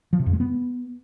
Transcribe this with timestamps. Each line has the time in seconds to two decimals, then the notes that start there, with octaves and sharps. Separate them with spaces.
0.13 F3
0.20 C3
0.26 F2
0.33 G#3
0.40 B3